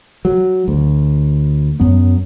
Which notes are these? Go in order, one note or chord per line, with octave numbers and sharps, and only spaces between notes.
F#3
D2
F#2 F#3 B3